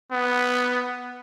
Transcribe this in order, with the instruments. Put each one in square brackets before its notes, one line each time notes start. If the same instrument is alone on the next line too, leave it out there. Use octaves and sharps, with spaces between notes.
[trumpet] B3